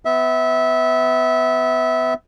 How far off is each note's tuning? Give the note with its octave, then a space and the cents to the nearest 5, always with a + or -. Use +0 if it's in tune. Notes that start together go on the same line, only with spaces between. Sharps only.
B3 +25 E5 -20